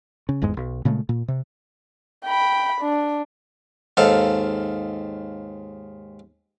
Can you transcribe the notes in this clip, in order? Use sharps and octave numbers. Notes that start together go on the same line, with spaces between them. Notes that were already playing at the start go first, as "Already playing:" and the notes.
C#3
G1 E2 G#2 G#3
B1
A#2 C#3 G#3 A3
A#2
C3
G5 B5
D4
D#2 G#2 A4 F5